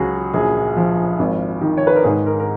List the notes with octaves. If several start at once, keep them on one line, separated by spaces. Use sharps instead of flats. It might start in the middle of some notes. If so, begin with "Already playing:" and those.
Already playing: C#2 F#3 F#4 G#4
A#1 G#4
F3
G#1
D#3
C#5
B4
A#4
G#2 G#4
A#4
A#4